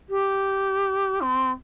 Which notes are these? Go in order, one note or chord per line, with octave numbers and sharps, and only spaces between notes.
G4
C4